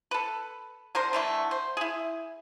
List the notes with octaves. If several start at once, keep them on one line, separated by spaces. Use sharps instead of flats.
A4 B4
D3 A#4 C5
D3 E3 A3
C5
E4 G#4